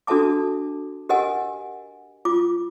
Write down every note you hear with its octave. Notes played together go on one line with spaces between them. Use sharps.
D4 F#4 A4 E5 A5 D6
G4 A#4 D#5 F#5 G#5
F4 D6